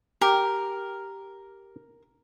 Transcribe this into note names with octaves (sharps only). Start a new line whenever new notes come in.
G4 A#4